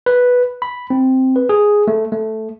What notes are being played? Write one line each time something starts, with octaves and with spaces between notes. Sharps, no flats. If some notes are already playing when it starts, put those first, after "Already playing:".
B4
B5
C4
B4
G#4
A3
A3